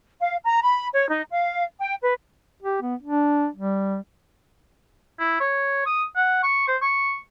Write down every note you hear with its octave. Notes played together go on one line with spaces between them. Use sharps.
F5
A#5
B5
C#5
D#4
F5
G5
B4
G4
B3
D4
G3
E4
C#5
D#6
F#5
C#6
C5
C#6